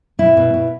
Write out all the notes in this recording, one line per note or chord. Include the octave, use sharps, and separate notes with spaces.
B2 E4
B2
B2